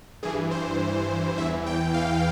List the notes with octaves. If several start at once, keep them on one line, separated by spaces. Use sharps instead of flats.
G2 E3 G#4
C5
E2 E3 E5
G5
F5